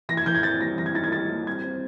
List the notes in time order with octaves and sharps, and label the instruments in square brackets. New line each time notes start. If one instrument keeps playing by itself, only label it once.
[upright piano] E3 A#6
G#6
E3 G6
G#6
C4 A6
G3 A#6
E3 A#6
G#6
D#4 A6
G#6
G3 A6
G3
C4 G#6
C4